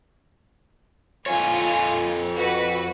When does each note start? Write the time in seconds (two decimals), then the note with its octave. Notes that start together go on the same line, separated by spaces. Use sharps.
1.26 F2 F4 C#5 G#5
2.36 F#4 B4